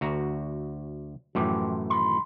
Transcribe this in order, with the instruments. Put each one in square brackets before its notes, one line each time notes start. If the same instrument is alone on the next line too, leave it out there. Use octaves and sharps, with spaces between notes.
[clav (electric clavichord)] D2 F#4 A#5
[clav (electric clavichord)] F#2 A2 E3 [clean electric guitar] F3 G4
[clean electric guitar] D#3 B5 C6